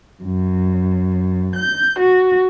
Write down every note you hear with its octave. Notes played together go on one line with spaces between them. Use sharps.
F#2
G6
F#4